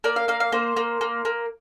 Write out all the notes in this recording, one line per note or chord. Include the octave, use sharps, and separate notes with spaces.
A#3 D5
F5
A#3 F5
F5
A#3 C5
A#3
A#3
A#3